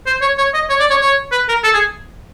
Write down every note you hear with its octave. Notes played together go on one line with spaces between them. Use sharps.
C5
C#5
C#5
D#5
C#5
D5
C#5
C#5
B4
A#4
A4
G#4